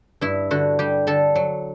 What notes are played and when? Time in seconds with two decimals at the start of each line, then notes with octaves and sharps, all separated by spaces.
0.21 G2 E4
0.51 D3 F#4
0.79 G3 G4
1.07 D3 A4
1.35 F#3